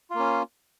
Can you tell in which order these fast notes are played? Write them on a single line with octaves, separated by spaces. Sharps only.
F4 A#3 C#4